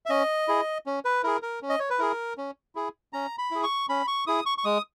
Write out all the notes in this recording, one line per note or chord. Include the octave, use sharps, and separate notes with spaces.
E5
C#4 D#5
E4 G#4
C#4
B4
E4 G#4 A#4
A#4
C#4
D#5
C#5
B4
E4 G#4 A#4
C#4
E4 G#4
C#4 A#5
B5
E4 G#4
C#6
C#4 B5
C#6
E4 G#4 D#6
C#6
C#6
G#3 D#6